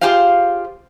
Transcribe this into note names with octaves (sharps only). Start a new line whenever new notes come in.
F4 G4 G#4 C5 F5